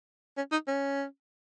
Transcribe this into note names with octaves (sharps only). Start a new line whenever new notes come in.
C#4
D#4
C#4